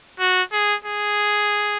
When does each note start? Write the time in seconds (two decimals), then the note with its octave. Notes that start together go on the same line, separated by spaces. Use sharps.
0.20 F#4
0.53 G#4
0.85 G#4